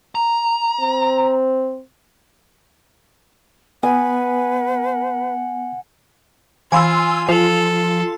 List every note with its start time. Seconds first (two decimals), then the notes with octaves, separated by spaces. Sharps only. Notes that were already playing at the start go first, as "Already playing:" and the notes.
0.15 A#5
0.80 C4
3.83 B3 B4 F#5 G#5
6.72 E3 F4 F5 G#5 B5 C6 E6
7.29 F3 F4 A4